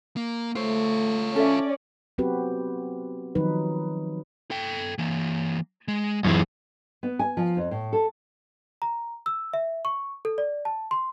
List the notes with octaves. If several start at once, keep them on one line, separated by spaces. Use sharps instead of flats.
A#3
A3 F4 C5 C#5
C#4 A4 D5 E5
F#3 B3 C4 F#4 G4 B4
D#3 F3 F#3 D#4 B4
A4 G5
E3 A#3
G#3
F#2 E3 C#4 G#4
B3
G#5
F3
F2
A2
A4
A#5
E6
E5
C#6
A4
D5
A5
C6